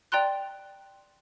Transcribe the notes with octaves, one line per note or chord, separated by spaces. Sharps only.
D5 G5 A#5 C6 F#6